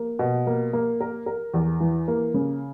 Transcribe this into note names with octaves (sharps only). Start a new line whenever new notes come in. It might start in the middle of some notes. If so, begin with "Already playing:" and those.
Already playing: A#3
B2
A#3
A#3
A#4
A#4
E2
E3
A#3
C#3